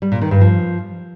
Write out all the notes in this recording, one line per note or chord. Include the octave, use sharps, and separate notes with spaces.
G3
A#2
D#3
G2
F3